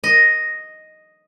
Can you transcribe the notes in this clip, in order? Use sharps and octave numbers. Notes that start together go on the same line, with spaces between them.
D#5